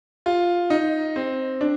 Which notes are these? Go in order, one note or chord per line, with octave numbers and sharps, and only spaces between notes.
F4
D#4
C4
D4